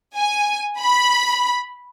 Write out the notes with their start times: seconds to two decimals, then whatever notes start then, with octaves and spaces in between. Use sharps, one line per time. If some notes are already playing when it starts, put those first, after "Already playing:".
0.17 G#5
0.79 B5